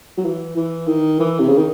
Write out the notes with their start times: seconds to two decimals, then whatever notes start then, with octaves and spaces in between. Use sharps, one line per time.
0.17 F#3
0.25 E3
0.56 E3
0.87 D#3
1.19 E3
1.40 C3
1.48 C#3
1.57 D#3